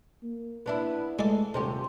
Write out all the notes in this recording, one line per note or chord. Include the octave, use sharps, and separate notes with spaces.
A#3
B3 D4 E4
G#3 A3 A4 D5
D#1 C3 C#4 G4